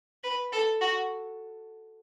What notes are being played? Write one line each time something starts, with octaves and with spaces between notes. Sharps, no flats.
B4
A4
F#4